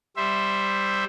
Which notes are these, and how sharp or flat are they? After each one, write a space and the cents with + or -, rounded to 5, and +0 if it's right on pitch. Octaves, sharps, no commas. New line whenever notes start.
G3 +0 C5 +0 E5 +0